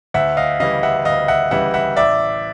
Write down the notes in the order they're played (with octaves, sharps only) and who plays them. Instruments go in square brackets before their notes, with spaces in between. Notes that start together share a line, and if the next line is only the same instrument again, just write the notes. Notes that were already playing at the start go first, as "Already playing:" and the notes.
[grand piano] D2 E5 F#5
D#5 F5
C#3 E3 G3 D#5 F5
E5 F#5
D2 D#5 F5
E5 F#5
C#3 E3 G3 E5 F#5
E5 F#5
A1 D5 E5